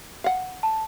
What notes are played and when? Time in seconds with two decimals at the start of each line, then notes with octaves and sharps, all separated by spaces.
0.24 F5 F#5
0.63 A5